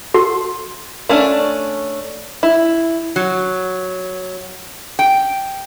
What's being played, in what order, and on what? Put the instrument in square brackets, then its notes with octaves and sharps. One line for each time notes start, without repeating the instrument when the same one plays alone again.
[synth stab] F#4 A4 C6
[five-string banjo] A3 C#4 D4
E4
[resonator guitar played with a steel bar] F#3
G5